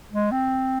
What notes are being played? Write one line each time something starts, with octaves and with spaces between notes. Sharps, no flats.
G#3
C4